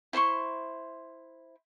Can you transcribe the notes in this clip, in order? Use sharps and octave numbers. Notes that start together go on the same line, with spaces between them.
E4 C5 C6 C#6